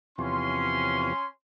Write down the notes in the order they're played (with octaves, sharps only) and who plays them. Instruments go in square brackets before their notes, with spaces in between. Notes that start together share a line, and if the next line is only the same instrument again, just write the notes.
[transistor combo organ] E2 C3 F3 [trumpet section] C#4 C6